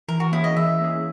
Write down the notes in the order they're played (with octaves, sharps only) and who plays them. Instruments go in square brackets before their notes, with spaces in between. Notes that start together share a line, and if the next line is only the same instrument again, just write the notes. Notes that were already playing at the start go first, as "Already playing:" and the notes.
[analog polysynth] E3 [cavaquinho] A#4
[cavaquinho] F#4
[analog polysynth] A#3 C#4 G#4 [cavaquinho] E4
[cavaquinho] D#5
[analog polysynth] E3 [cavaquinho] E5
[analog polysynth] A#3 C#4 G#4